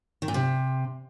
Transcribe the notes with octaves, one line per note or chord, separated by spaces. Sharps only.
D#3
A#2
C3